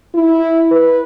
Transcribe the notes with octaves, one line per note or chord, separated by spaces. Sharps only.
E4
B4